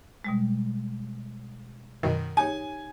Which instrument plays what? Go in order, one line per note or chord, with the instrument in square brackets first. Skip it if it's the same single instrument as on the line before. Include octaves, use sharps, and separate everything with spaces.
[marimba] B2 G3 G#3
[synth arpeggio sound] F#2 B2 D#3
[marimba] D#4 G4 C#5 [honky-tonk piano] G#5